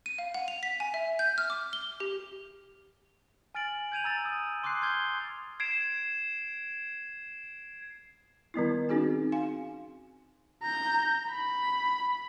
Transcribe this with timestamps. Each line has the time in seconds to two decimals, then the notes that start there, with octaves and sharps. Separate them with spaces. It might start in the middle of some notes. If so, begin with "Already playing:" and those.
0.06 D#7
0.18 F5
0.34 F#5
0.48 F7
0.63 B6
0.80 G#5
0.94 E5
1.19 G6
1.38 F6
1.50 D6
1.73 G7
2.00 G4
3.55 G#5 F6 A6 D7 F#7
3.92 G6 G#6 D#7 F7
4.04 A#5 E6 A6
4.25 D#6
4.64 C6 D6 D#6 F#6 C7
4.82 C6 F6 G6 G#6 G7
5.60 G#6 C7 D7 E7
8.54 D#3 G3 B3 E4
8.89 C4 C#4 D#4 F#4 G#4 G#5
9.32 F5 G#5 C6
10.63 A#5 G6
11.31 B5